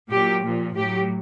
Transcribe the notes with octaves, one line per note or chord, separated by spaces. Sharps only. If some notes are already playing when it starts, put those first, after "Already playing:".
A#2 F#3 G4
A#2 F3
A2 F#3 G4